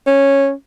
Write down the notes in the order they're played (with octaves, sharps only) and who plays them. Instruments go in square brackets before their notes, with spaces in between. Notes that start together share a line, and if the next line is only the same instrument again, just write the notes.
[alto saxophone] C#4